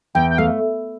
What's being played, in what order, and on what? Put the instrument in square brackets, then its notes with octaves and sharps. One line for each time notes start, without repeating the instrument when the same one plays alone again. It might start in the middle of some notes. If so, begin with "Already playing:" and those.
[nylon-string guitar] E2 [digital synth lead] G5
[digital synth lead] G5
[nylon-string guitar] A3 [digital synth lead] F5